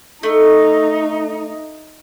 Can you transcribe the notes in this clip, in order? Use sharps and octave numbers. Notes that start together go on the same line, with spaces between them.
A3 D#4